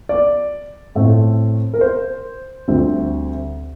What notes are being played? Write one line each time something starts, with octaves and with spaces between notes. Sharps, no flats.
D5
A2 A3 C4
A#4
C5
D2 D3 G3 C4